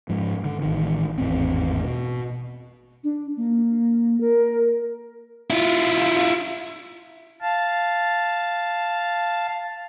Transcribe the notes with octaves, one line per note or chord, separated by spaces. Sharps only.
G#2 F3
D3
A1 D#3
G#1 E2 A2 C4
B2
D4
A#3
A#4
E4 F4
F5 A5